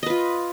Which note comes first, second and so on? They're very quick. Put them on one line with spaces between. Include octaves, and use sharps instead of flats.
D#5 B4 F4